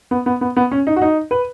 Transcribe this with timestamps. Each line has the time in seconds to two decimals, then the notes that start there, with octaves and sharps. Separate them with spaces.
0.11 B3
0.26 B3
0.41 B3
0.57 B3
0.71 C#4
0.87 D#4
0.96 F#4
1.02 D#4
1.31 B4